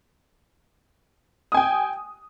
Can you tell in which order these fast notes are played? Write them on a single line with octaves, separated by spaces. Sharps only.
D#6 G#5 G5